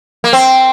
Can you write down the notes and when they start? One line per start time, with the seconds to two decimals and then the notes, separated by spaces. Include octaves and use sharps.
0.24 A#3
0.33 C4